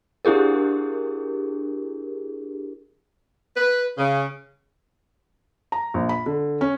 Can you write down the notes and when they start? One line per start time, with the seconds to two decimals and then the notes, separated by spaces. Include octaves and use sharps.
0.25 D4 E4 G4 G#4 A#4
3.57 B4
3.98 C#3
5.72 A#5
5.94 A#1
6.09 B5
6.26 D3
6.61 C#4